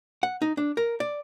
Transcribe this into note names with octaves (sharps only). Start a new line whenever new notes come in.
F#5
D#4
D4
A#4
D5